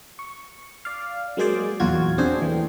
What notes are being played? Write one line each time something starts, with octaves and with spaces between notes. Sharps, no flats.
C#6
D5 F5
F#3 G#3 A#3 G#4 C5 D5
E2 A#2 F#3 F4 F#4 G#6
C4 D4 G#4 C5
E3 A3 C4